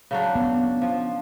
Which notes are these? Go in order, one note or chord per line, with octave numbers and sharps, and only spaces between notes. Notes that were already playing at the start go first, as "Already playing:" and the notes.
C#3 F#3 D4
B3
F3